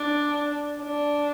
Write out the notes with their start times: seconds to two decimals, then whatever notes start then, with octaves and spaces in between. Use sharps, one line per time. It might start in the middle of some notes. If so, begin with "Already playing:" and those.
Already playing: D4
0.82 D4